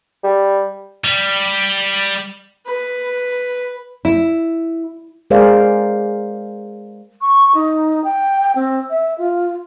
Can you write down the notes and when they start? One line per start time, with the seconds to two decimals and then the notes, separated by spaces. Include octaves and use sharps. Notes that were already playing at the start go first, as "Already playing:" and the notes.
0.24 G3
1.04 G3
2.67 B4
4.05 E4
5.30 G#3 G#4 A#4 C5 D5 F5
7.21 C#6
7.55 D#4
8.04 G5
8.55 C4
8.90 E5
9.18 F4